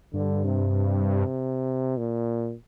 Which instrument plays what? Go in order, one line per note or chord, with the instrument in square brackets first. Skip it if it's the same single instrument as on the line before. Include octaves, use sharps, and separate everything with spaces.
[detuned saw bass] G2 [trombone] D3
[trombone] C3
A#2